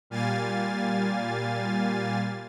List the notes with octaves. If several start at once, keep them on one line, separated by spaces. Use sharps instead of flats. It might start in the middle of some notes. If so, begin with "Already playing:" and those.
A#2 G3 F5 G#5 A6